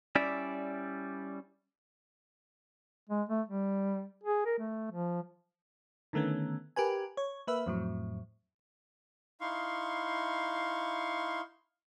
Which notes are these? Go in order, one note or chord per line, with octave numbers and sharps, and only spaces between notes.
G3 C#4 E4 D5 E5
G#3
A3
G3
G#4
A#4
A3
F3
D3 D#3 A3 B3 C#4
G4 A#4 B4 G#5
C#5
A#3 B4 E5
F2 A2 F#3
D#4 E4 F5 C6 C#6